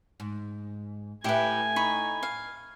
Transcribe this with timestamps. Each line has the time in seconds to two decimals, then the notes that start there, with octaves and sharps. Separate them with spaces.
0.20 G#2
1.24 A2 E4 G4 B4 G#5
1.76 D#4 B5 C#6
2.23 F5